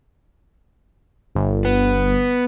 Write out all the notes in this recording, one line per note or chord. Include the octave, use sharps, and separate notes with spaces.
G1
B3